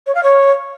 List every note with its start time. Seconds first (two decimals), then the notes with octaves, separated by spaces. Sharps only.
0.06 C#5
0.15 F5
0.23 C#5